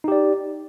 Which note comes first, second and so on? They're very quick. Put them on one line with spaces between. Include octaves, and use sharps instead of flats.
D#4 G4 D5